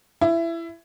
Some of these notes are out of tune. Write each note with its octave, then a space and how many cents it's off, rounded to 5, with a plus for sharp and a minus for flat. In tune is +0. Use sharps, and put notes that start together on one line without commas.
E4 +20